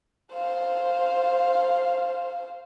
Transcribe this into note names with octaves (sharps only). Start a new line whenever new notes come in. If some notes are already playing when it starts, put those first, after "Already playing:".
C5 F5